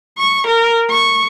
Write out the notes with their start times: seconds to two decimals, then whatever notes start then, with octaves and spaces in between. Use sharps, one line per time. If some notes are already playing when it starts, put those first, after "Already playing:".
0.18 C#6
0.47 A#4
0.90 C#6